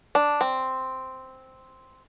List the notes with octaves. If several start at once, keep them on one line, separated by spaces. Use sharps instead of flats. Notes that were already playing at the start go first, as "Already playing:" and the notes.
D4
C4